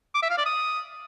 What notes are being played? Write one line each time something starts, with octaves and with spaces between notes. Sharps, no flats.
D6
E5
F5
D5
D#6